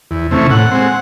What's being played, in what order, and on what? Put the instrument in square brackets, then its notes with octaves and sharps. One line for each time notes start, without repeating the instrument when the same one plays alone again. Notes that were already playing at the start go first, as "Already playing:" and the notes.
[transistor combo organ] E2
C3 E3 A3 C#4
A2 F#5
G#3 C4